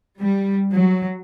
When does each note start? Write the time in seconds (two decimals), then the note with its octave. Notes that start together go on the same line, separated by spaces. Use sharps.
0.19 G3
0.70 F#3